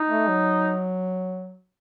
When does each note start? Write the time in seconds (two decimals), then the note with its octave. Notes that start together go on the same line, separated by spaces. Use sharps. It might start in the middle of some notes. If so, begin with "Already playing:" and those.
Already playing: D#4
0.08 A3
0.28 F#3